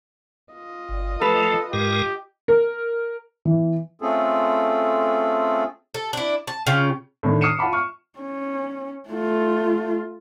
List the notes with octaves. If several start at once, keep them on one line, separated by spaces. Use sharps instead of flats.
F4 D#5
G1
F3 A3 A4 B4
G#2 G#3 G4 A#4
A#4
E3
A3 C4 C#4 F4 G#4 A4
A4
D4 E4
A5
C#3 C#4 F4 G5
A2 D3 D#3
D#6 F6 C7 C#7 D#7 E7
F4 F#5 A5 B5 D6
C#6 F6
C#4
A3 F4